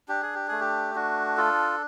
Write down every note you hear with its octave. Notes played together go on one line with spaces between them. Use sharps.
D4 G4
G#4
G4
A3 G#4
G4
D4 F#4
F4 A4